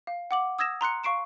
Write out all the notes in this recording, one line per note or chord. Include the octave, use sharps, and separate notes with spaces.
F5
F#5 D6 F#7
D#6 E6 G#6 A#6 E7
A#5 C6 F#6 C#7
F5 C#6 C7 D7 E7